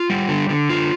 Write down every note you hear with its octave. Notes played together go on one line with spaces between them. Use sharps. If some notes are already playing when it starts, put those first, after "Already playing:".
Already playing: F4
G3
D3
D3
F4